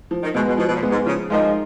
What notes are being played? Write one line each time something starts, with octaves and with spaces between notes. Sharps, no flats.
F3
D#3
B2 G#3 B3
B2
B2 F3
B2
A#2
G#3 B3
G#2
C#3 F3
F3 G#3 D#4 A#4 D#5